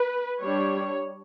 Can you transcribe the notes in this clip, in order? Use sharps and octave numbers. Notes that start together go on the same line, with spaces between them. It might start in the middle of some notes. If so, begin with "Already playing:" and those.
Already playing: B4
G3 D4 C#5